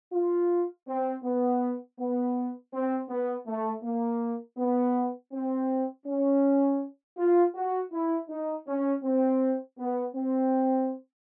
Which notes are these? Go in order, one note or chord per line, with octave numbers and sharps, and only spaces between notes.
F4
C4
B3
B3
C4
B3
A3
A#3
B3
C4
C#4
F4
F#4
E4
D#4
C#4
C4
B3
C4